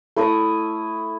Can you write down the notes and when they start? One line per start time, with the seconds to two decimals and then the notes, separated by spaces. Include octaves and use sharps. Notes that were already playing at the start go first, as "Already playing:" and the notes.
0.16 A3 E4 D#6